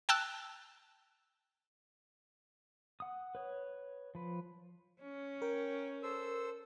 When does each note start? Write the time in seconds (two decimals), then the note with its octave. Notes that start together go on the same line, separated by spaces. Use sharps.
0.09 G5 A5 E6 F#6
3.00 F#5 D#6
3.35 B4 C#5
4.15 F3 B4
5.01 C#4
5.42 A#4 G5
6.03 A4 C5 E6